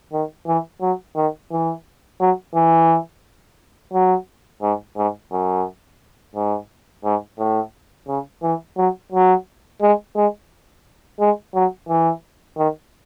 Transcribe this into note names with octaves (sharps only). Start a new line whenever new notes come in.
D#3
E3
F#3
D#3
E3
F#3
E3
F#3
G#2
G#2
F#2
G#2
G#2
A2
C#3
E3
F#3
F#3
G#3
G#3
G#3
F#3
E3
D#3